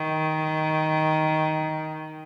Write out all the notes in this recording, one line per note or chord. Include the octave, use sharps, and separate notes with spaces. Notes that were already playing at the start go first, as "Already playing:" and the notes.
Already playing: D#3